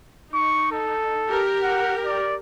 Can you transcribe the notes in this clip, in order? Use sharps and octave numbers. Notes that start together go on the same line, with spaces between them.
D#4 C#6
A4
G4 A#4
F#5
D5